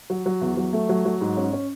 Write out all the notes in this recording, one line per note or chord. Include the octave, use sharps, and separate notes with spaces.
F#3
F#3
E2
F#3
A3
F#3
F#3
G#2
C#4
C#4